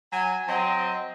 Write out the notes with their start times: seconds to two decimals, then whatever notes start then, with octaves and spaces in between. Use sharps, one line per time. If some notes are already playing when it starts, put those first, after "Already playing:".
0.13 F#3 G#5
0.48 F#3 C4 D#5